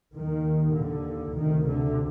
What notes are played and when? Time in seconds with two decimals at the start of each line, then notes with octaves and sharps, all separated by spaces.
0.16 D#2 D#3
0.76 D3
1.35 D2 C3 D#3
1.66 D3